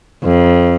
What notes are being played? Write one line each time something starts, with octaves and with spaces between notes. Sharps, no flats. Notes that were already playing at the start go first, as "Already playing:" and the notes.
F2